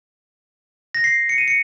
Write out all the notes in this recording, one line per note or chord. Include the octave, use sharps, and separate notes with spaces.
A#6
C7
C#7
D#7
C#7